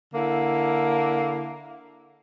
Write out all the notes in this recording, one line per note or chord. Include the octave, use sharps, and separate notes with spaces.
D3 A#3 E4